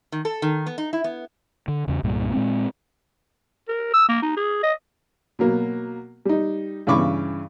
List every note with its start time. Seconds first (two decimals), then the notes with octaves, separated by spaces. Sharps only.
0.12 D#3
0.25 A4
0.42 D#3
0.67 B3
0.78 D#4
0.93 E4
1.04 B3
1.68 D3
1.88 E2 C#3
2.03 C2 G2 A#2 G3
2.33 A#2 G#3 C4
3.68 A#4
3.94 E6
4.09 A#3
4.22 D#4
4.36 G#4
4.63 D#5
5.39 B2 F#3 A#3
6.25 G3 D#4
6.87 G2 C#3 E3 B5 C#6 D6